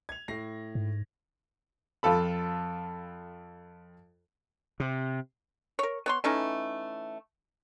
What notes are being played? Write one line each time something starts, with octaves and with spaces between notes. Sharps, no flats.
G#6 F7
A2 A#6 C7
G#2
F2 F4 A4 B5
C3
A#4 C#5
B3 C#5 C6
E3 A3 C#4 D#4